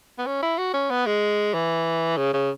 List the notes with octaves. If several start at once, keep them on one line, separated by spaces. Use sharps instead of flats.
B3
C#4
E4
F#4
C#4
B3
G#3
E3
C#3
C#3